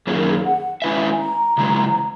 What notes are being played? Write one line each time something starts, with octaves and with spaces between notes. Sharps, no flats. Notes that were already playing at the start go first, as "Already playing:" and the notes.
F#2 D#3 A#3 C#4 G#4
A#4
G#4
F#5
G#3 C#4 E4 B4 E5 G#5
A#5
C#3 E3 G#3